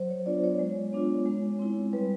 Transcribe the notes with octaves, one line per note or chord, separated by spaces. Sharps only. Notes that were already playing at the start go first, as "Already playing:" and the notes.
Already playing: F#3 C5
C#5
B3 D4 F4 D5
C#5
G#3
B3 D4 F4
G#3
C4 E4
G3 B4